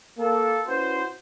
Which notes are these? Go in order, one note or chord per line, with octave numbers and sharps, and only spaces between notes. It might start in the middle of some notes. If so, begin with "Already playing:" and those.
A#3 A4
C#4 E4 F#4 B4 C5